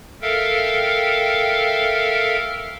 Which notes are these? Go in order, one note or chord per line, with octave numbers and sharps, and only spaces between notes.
A4 A#4 E5 F5 G5